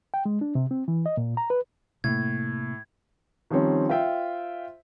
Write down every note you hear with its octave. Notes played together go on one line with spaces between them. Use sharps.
G5
G#3
D4
C3
C4
E3
D#5
A#2
A#5
B4
A2 C3 A#3 G#6
D#3 F3 G3 C4 C#4
F4 C5 E5 G5